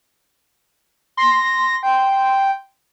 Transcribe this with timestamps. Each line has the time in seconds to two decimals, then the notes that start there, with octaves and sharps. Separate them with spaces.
1.17 C6 A#6
1.83 G5